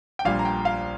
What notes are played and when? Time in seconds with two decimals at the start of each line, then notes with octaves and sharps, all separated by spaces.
0.19 G5
0.25 A#1 A#2 G3 F5
0.39 A#5
0.45 G5
0.65 F5